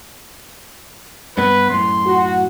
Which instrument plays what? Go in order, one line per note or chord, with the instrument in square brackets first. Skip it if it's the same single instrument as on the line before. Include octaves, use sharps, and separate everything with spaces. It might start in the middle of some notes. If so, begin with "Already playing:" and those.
[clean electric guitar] G2 B3 [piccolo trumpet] B4
[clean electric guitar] F#2 A2 [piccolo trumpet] C6
[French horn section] F#4